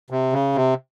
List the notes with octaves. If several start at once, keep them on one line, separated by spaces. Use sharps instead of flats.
C3
C#3
C3